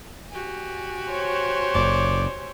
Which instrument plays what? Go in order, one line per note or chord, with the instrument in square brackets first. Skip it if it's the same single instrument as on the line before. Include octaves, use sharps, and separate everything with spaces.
[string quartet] F#4 G4 G#5
[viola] C5 C#5
[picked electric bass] F#1 [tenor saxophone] D5